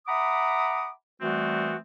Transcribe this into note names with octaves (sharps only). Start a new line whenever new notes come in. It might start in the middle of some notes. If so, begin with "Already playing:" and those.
E5 F#5 A#5 B5 D6 D#6
E3 G3 A3 B3 C4 F#4